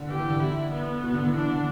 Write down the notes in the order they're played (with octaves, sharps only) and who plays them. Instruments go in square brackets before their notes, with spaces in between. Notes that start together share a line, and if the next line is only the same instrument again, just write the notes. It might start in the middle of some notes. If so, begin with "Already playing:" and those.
Already playing: [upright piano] D3
[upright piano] E3 [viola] G4
[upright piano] E3
D3
[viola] E4
B3
[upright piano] B2
D3
E3
[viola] D4
[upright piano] D3